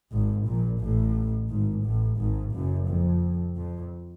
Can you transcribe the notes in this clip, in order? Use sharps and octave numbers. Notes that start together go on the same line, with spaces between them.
G#1 G#2
A#1 A#2
A1 A2
G#1 G#2
A1 A2
G#1 G#2
F#1 F#2
F2
F2